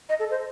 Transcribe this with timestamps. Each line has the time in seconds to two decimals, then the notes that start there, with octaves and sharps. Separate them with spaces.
0.09 D#5
0.19 A4
0.30 C5